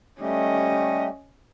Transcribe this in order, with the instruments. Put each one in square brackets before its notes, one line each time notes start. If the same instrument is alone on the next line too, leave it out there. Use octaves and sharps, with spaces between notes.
[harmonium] G3 A3 G4 [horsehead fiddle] C#4 D#5